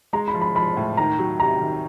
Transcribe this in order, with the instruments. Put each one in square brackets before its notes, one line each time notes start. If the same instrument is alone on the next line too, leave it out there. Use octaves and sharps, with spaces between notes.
[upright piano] G#3 [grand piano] A#5
[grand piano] B5
[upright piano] F3
[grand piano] B5
[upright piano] F3 [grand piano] B5
[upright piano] A2
[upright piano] D#3 [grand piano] A#5
[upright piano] F#3
[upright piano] C3 [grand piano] A#5
[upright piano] D#3